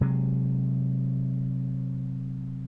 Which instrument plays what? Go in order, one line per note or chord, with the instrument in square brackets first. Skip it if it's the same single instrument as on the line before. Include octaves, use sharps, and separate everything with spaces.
[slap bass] C3 F#3 G#3